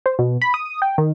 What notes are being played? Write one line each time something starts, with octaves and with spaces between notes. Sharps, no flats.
C5
B2
B5
D#6
G5
D#3